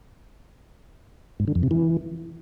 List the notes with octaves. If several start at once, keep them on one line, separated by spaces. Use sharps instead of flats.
G#2
D3
F2
C3
E3